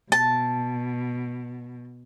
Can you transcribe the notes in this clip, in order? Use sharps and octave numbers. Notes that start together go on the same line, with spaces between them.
B2 A5